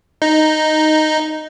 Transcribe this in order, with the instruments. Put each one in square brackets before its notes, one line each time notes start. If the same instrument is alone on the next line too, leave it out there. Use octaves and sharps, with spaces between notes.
[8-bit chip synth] D#4